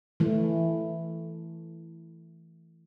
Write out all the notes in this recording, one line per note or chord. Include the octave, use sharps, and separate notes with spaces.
E3 A3